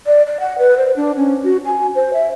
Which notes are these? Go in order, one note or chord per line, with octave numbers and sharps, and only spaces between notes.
D5
D5
F#5
B4
C5
D4
C#4
F#4
G#5
C5
E5